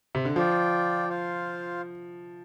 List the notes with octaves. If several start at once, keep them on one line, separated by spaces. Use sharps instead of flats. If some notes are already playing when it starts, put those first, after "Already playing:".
C3
D3
F3 F4 D5 G5
F4 C5 F5